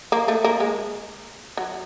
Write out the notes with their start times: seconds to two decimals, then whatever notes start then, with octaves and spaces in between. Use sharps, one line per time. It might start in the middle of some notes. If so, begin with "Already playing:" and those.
0.12 A#3
0.28 A3
0.44 A#3
0.60 G#3
1.57 F#3